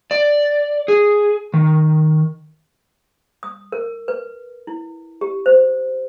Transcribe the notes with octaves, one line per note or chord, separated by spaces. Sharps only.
D5
G#4
D#3
D#6
A#4
B4
E4
G4
C5